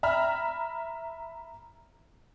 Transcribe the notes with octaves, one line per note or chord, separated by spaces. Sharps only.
E5 A#5 B5 F6